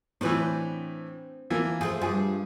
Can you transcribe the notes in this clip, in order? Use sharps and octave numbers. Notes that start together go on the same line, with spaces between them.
A2 E3 C4 D4 B4
E3 F3 A#3
F3 A3 C4 G#4
G2 F3 G3 G#4